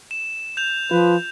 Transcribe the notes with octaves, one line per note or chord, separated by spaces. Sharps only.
E7
G6 F7
F3 F4 B4